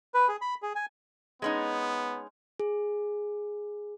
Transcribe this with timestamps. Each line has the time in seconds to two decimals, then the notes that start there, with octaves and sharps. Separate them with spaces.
0.14 B4
0.28 G#4
0.41 B5
0.62 G#4
0.75 G#5
1.42 G#3 B3 C#4 D#4
2.60 G#4